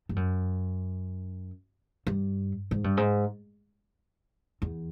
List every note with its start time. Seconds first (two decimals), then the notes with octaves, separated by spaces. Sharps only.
0.09 G2
0.16 F#2
2.07 G2
2.71 G#2
2.84 G2
2.97 G#2
4.62 E2